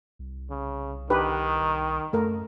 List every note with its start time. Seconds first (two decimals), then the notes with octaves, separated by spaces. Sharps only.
0.19 C2
0.50 C#3
1.10 D#3 D4 G4 B4
1.61 C2
2.13 F#2 A3 A#4